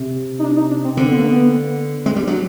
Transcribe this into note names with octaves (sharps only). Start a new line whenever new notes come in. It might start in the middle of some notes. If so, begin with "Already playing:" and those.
Already playing: C3
D#4
D4
D#4
D4
C4
D3 C4
B3
A#3
B3
G#3 C4
G3
D4
F#3